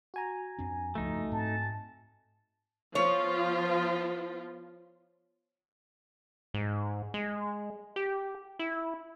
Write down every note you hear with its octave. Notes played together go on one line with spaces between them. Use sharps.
F#4 G#5 A#5
F2 C4 D4
C#2 G2 F3 A3 D#4
G#2 C4 A5
F3 B3 F4 C#5
G#2
G#3
G4
E4